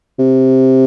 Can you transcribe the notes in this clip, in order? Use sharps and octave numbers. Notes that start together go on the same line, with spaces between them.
C3